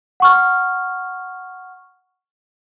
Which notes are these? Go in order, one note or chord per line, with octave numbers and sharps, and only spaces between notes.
F#5 C#6 F6